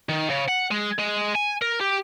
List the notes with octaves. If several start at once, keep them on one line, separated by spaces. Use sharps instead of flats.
D#3
C#3
F#5
G#3
G#3
G#5
A#4
G4